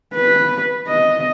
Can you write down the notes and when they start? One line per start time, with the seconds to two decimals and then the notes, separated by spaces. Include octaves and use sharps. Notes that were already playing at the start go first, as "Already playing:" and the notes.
0.15 B4
0.88 D#5